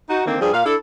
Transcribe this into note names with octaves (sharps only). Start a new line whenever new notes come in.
D#4 F#4
D3 D#3 A#3 C4
G2 F3 G3 G#4
A#2 F5
D4 E4 A4